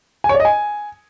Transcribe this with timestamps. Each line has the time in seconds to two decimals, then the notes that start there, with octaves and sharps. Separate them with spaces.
0.24 G#5
0.29 C#5
0.35 D5
0.40 D#5
0.45 G#5